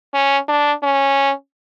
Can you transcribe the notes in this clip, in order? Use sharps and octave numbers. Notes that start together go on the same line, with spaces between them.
C#4
D4
C#4